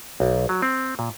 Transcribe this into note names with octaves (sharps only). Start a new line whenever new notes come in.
B1
F#3
C4
A#2